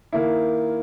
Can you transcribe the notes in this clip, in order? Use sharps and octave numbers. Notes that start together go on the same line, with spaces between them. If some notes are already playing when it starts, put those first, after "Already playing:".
D#3 A#3 E4